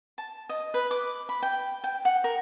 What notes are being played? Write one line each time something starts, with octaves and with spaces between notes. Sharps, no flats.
A5
D#5
B4
D6
B5
G5
G5
F#5
A#4